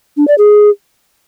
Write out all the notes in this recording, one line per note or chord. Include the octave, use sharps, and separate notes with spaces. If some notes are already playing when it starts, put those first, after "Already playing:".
D4
D5
G#4